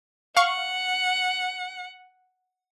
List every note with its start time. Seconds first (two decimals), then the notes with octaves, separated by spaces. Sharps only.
0.37 F5 F#5 C#6